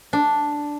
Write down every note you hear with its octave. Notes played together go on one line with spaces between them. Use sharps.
D4